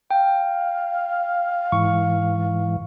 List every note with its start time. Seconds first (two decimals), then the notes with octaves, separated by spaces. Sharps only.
0.11 F5 G5
1.72 G#2 E3 C#6